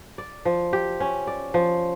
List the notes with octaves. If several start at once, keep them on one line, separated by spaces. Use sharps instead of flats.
D5
F3
G4
C#4
D5
F3